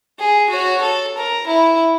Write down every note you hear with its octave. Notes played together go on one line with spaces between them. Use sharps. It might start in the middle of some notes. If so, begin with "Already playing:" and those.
G#4
F#4 C#5
A4
A#4
E4